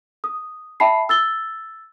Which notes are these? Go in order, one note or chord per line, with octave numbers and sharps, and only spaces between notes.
D#6
E5 G5 A5 B5 C7
E6 A6 G7